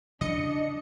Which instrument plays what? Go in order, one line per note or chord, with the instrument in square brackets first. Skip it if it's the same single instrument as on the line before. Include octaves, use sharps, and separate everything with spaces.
[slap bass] C#3 E3 G3 [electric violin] D4 [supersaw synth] D#5 C#7